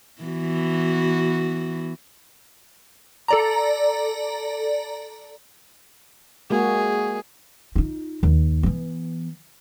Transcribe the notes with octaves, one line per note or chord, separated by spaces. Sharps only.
E3 B3 F#4
A4 D5 A#5
G#3 A#3 F#4 G#4
D#4 F4
D#2
E3 B3